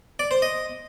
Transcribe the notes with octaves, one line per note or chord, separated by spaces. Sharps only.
D5
C5
D#5